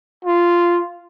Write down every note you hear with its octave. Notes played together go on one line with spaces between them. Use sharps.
F4